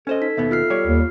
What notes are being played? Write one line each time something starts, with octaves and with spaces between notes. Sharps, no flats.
C#4 A4 C5 D#5
D#4 B6
D#2 B2 B3 E5
F4 F6 C7
G3 C#5
D#2